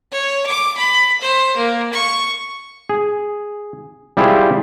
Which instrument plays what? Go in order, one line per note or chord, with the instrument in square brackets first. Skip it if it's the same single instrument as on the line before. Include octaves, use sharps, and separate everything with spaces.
[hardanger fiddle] C#5
D6
B5
C5
A#3
C#6
[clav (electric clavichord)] G#4
G3 E4 F4 G4 G#4 C5